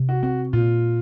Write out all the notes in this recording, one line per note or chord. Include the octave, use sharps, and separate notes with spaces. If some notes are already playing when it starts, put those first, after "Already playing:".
Already playing: C3
F#4
C4 F#4
A#2 F4